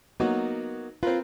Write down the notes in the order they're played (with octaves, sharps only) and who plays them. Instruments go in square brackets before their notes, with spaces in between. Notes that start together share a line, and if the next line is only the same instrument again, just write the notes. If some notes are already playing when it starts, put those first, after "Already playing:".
[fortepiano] F#3 D#4 F#4 [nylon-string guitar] A#3 B3
[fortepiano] C4 A#4 B4 [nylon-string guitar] F4